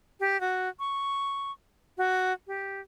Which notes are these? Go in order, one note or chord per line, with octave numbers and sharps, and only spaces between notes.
G4
F#4
C#6
F#4
G4